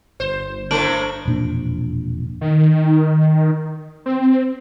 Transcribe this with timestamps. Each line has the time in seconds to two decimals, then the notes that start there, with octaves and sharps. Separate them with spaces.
0.20 G1 C5
0.71 A2 A3 D4 A#4 C5 F6 D7 F#7
1.25 E1 F2 A#2 D4
2.41 D#3
4.06 C4